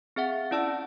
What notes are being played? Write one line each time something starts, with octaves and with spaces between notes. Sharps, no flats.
C4 G#4 E5 F#5
C#4 E4 D5 A5 E6